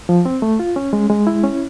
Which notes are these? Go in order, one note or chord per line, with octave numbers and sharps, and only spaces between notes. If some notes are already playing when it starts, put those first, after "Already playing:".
F3
C4
A3
F4
C#4
G#3
G#3
E4
C#4